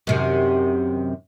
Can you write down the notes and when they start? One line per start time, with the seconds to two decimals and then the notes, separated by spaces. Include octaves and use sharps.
0.07 F#2 C3 D#3